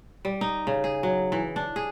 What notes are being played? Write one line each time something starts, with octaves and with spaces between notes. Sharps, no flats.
G3
D#4
C#3
G#4
F#3
E3
D4
G#4